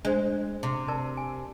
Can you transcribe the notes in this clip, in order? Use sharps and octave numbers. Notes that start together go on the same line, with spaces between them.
G#3 D4 C5
C3
A#4 D5 A5
G#5